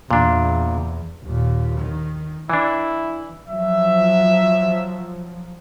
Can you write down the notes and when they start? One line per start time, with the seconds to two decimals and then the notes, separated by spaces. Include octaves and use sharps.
0.11 E2 A#2 D4
1.24 D#2 A#2
1.79 D#3
2.50 E3 D4 E4
3.48 F3 F#3 E5